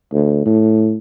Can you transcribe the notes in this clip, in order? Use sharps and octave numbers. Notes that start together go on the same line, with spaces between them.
D2
A2